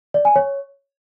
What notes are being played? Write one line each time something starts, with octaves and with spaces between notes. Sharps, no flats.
D5
G#5
C#5